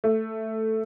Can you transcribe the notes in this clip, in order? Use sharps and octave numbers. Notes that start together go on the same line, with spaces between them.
A3